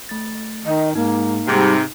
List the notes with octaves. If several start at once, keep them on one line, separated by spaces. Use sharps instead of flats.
A3 A6
D#3 D#5
G#2 A#3 D#4
G#2 C3 G3